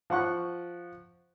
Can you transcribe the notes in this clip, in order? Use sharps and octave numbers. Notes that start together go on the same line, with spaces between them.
F3 F#5 C#6 F#6